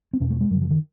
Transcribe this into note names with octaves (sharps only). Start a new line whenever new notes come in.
C4
E2 B2 C#4
A3
G#3
F#2 C#3 F#3
F3
D#3